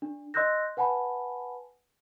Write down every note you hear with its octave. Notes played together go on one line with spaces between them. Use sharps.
D4
D#5 C6 E6 F#6 G6 A#6
B4 F#5 G#5 A5 B5